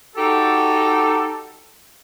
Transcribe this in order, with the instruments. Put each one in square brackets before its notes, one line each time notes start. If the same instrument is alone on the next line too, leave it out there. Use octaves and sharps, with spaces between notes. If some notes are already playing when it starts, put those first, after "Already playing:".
[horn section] D#4 F#4 G4 A4